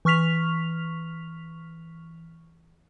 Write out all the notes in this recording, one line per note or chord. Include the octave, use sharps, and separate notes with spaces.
E3 C#6 F6 B6 F7